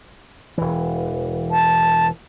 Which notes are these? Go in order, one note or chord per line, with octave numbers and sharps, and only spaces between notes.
E1 E3
A5